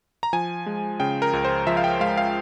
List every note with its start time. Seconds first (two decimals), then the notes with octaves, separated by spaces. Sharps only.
0.23 A#5
0.33 F3 G#5
0.66 G#3
1.00 C#3 G5
1.22 A#4
1.33 C#2
1.45 C5
1.67 F3 E5
1.77 F5
1.84 G5
2.00 G#3 F5
2.17 F5